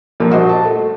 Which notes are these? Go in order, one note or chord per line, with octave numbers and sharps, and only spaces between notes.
G2 A#2 F3 A#3
F#4 C5 D#5
A5
A3